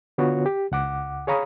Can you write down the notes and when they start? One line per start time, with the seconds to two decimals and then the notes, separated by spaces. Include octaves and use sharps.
0.18 D3 B3 F4 F#4 C#5
0.46 G4
0.72 C#2 F#5 D6
1.27 G#4 C#5 F5 A#5 B5 D#6